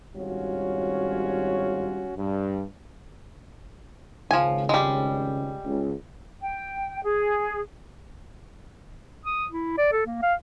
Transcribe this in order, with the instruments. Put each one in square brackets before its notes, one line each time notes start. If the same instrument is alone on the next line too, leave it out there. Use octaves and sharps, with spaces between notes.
[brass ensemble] G#1 G3 C#4 F4 F#4 C#5
G2
[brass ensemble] G#1 C#2 C#3 [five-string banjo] F3 G#5
[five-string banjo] G3 G#3
[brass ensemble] C#2
[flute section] G5
G#4
[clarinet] D#6
E4
D5
A4
A#3
F5